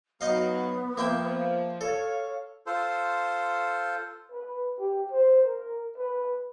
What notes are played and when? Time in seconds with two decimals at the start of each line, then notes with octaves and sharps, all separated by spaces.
0.21 F#3 B3 D#4 D#5 F5
0.98 F3 A#3 E5 G5
1.81 A4 C#5 F5
2.66 F4 A4 C5
4.32 B4
4.80 G4
5.12 C5
5.45 A#4
5.97 B4